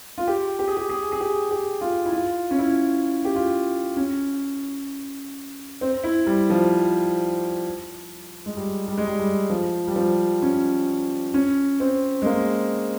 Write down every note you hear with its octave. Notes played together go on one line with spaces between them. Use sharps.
F4
G4
G4
G#4
G4
G#4
G#4
G4
G4
F4
E4
F4
C#4
E4
G4
F4
C#4
C4
E4
G3
F3
G#3
G3
G3
G#3
G3
G3
F3
G3
F3
C#4
C#4
C4
G#3
A#3